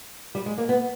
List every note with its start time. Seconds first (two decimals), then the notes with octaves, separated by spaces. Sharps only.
0.35 G3
0.46 G#3
0.58 A#3
0.69 B3